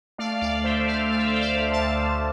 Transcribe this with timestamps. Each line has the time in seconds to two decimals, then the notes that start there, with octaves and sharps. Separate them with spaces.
0.18 A3 D5 F5
0.41 D2 D5 F5
0.64 A3 C5 E5
0.87 D2 D5 F5
1.10 D2 F5
1.18 E5
1.26 D5
1.33 D2 C5 E5
1.41 D5 F5
1.56 A3
1.72 F5 A5
1.80 D2
2.03 A3